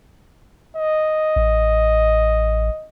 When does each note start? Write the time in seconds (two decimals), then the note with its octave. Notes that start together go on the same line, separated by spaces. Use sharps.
0.77 D#5
1.36 A1